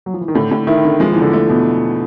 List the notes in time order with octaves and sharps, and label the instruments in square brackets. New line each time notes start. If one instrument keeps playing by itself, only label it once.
[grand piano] F#3
F3
E3
D#3
[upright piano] A2 [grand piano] D3
[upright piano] A2
[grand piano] D#3 [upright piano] E4
[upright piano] D3
[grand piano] F3 [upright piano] G#3
[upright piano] E2 [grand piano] E3
[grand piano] D3
[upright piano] A3
[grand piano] B2